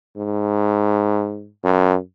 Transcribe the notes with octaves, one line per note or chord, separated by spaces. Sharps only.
G#2
F#2